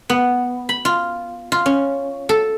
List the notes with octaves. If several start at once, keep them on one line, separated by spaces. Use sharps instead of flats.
B3
B5
F4
F4
C#4
A4